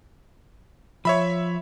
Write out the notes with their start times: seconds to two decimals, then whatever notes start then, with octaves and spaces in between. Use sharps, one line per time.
1.05 F3 C#5 E5 B5